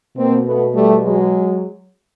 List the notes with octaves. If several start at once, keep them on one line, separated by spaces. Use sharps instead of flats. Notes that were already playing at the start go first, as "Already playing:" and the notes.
B2 A#3 C4
A3 B3
G3 A3
F#3 G#3